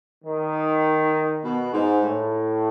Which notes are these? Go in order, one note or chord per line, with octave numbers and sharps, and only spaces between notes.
D#3
B2
G#2
A2